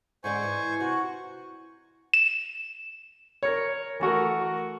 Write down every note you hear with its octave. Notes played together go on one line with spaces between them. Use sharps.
G#2 D3 C5 D5 G#5 C#6
E3
C3 F#4
E7
A#4 C#5
E3 A3 F#4 A#4